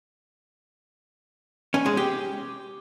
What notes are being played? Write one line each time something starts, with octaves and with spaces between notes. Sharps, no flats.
C#4
G#3
G4